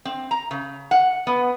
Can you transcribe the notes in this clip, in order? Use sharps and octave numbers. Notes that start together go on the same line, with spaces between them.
C4
A#5
C#3
F#5
B3